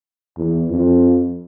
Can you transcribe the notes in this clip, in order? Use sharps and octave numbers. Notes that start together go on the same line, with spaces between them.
E2
F2